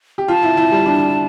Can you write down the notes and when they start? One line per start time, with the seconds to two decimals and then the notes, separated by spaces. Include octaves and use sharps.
0.18 G4
0.28 F4 A5
0.43 E4
0.57 E4
0.72 G3
0.86 D4